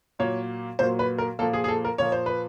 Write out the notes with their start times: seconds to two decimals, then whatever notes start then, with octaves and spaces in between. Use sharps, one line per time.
0.19 A#2 F#3 A#3 C#5
0.79 A#2 F#3 A#3 C5
0.99 B4
1.18 A#4
1.39 A#2 F3 A#3 A4
1.53 G#4
1.64 G#4
1.68 A4
1.85 A#4
1.98 A#2 F3 A#3 C#5
2.12 C5
2.26 B4